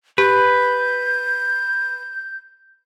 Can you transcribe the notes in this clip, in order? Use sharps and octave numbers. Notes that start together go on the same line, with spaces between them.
G4 B4 G6